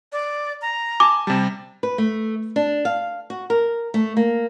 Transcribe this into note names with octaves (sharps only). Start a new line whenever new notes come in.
D5
A#5
G#5 A5 D6
C3 G3 A5
B4
A3
D4
F5
F#4
A#4
A3
A#3